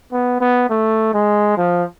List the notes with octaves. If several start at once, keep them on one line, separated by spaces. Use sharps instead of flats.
B3
B3
A3
G#3
F3